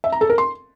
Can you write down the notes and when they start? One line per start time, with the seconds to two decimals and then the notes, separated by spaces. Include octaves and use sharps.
0.04 E5
0.12 A#5
0.21 A4
0.30 A#4
0.38 C6